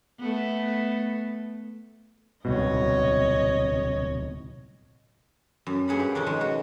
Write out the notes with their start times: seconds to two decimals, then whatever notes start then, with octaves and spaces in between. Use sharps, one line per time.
0.19 A3 B3
2.45 D1 C2 B2 C#5 D#5
5.67 F#2
5.88 G2 A#3 G#4 F#5 B5
6.00 G4
6.15 F2 B2 C#4 D4
6.26 D#3 G#3
6.41 F#4